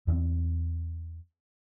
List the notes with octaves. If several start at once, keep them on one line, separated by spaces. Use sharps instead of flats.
E2 E3 B3 C4